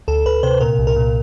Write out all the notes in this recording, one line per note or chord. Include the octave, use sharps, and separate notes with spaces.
D2 A4
D2 B4
C3 C5
A#2 A#4
C2
A#4
A#2